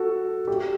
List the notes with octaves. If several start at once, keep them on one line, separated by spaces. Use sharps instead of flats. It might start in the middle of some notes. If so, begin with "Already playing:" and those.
Already playing: F#4 A4
G4